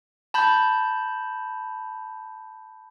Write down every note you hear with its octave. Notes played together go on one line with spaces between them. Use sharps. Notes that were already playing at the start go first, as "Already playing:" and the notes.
A5 B5 G6